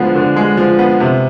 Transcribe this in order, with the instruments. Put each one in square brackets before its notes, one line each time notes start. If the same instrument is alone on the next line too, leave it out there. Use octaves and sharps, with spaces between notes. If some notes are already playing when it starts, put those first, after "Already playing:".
Already playing: [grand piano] D3 F3 G#3 B3
D3
G#3
F3
B3
C3